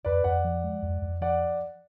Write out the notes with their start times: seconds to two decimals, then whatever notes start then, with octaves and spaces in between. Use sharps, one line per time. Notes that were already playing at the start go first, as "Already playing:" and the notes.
0.05 F2 B4 D5
0.24 F2 D5 F#5
0.45 F3
0.64 G#3
0.82 F2
1.02 F2
1.21 F3 D5 F#5